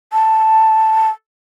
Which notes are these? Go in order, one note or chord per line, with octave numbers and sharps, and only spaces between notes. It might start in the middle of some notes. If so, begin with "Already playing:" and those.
A5